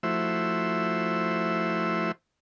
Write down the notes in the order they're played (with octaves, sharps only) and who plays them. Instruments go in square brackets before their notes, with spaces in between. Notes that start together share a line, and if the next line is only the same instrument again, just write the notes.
[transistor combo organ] F3 A3 E4 F#4 C5 E5